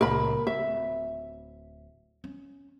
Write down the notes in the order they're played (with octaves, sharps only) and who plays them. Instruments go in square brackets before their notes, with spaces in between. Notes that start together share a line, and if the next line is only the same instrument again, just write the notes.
[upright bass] C#2 A#2 [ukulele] A#4 B5
[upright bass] D1 [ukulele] E5
[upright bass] C#4